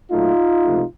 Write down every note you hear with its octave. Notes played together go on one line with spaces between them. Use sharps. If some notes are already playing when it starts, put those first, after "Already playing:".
A#2 F#3 A3 D#4 F4
C#2 C3 F3 A3